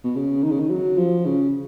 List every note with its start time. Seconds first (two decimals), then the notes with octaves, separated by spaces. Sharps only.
0.04 B2
0.16 C#3
0.43 D#3
0.51 C#3
0.60 D#3
0.70 F#3
0.98 F3
1.26 C#3